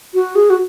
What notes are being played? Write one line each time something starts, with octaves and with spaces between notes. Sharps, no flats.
F#4
G#4
F#4